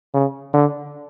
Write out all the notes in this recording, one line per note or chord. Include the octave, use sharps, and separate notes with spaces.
C#3
D3